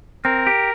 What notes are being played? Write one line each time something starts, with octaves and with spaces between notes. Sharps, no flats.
C4 A#4
G4